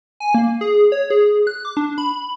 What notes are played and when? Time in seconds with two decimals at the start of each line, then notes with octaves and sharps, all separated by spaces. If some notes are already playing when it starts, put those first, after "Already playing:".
0.20 G#5
0.34 A#3
0.61 G#4
0.92 C#5
1.10 G#4
1.47 F#6
1.65 D6
1.77 D4
1.98 B5